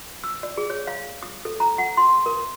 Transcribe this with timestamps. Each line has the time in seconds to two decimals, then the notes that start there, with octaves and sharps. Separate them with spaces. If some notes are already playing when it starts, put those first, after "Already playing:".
0.24 E6
0.43 D5
0.57 G#4
0.70 C#5
0.87 F5
1.23 D#6
1.45 A4
1.60 A#5
1.78 F#5
1.97 C6
2.26 A#4